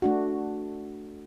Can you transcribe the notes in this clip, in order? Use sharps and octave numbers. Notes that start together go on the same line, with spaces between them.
A3 D4 F#4